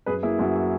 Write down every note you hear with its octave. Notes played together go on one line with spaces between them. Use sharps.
F#2 G#4 B4
A#3 E4 G#4
F#2 F#4
F#4